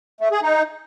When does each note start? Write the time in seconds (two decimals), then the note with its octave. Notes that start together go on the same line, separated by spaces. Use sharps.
0.21 A3
0.32 G#4
0.43 D#4